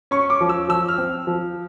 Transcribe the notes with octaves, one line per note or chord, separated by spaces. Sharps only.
C#4 C#6
D6
F3
E6
F3 E6
F6
C4
F3